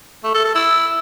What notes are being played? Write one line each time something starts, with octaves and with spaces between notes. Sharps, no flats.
A3
A4
A4
E4